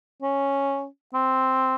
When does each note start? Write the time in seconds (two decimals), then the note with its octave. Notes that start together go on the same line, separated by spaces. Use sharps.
0.22 C#4
1.14 C4